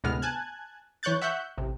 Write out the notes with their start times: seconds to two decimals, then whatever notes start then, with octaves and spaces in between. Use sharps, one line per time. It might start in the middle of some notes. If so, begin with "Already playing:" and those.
0.04 D2 A2 C3 G#3 B3 F6
0.22 G#5 A5 F#6 G#6
1.03 E3 C#5 C#6 F#6 G6 A6
1.22 E5 F#5 C#6 F#6 G6
1.58 A1 C3